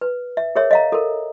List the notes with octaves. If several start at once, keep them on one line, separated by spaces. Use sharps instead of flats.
B4
E5
G#4 A#4 C#5 E5
D#5 F5 A#5
A4 A#4